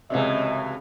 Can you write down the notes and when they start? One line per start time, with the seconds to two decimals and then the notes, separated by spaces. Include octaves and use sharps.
0.10 C#2 F#2 A2 C3 E3 D#5 E5